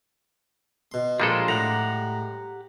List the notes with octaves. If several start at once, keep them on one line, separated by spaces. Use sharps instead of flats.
B2 C6
A#1 G3 G#3 F4 A4 A#4 C5
A2 G4 F#5 A#5